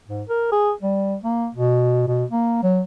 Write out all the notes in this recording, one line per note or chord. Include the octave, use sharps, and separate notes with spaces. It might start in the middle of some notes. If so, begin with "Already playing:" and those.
G#2
A#4
G#4
G3
A#3
B2
B2
A#3
F#3